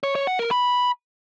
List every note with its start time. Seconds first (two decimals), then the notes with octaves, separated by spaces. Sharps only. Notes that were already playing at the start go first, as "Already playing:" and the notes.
0.03 C#5
0.15 C#5
0.27 F#5
0.39 A#4
0.51 B5